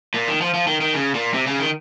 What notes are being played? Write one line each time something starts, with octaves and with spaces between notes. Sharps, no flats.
A#2
D#3
F3
F3
D#3
D#3
C#3
A#2
C3
C#3
D#3